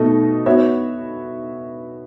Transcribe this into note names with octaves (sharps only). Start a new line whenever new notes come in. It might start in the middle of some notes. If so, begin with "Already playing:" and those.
Already playing: B2 A3 D#4 A4 D#5
B3 F#4 C#5 E5